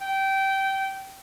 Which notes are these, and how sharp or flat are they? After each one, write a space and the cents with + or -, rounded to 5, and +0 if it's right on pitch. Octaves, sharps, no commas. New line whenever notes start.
G5 -20